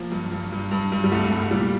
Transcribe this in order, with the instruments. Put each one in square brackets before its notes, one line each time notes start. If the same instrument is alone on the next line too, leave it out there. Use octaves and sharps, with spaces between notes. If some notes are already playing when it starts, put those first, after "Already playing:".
Already playing: [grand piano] F3 A#3
G2
G2
G2
G2
G2
G3
C2 A3
C2
A#2 G3